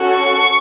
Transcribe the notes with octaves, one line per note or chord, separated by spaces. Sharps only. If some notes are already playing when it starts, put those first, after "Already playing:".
Already playing: C#4 F#4 A4
C#6